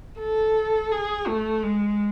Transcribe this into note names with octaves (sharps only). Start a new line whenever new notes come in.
A4
G#4
A3
G#3